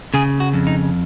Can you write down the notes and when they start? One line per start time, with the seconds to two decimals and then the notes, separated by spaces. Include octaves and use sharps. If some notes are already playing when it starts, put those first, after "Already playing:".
0.14 C#3 G#4
0.40 F#4
0.53 F2
0.67 D#4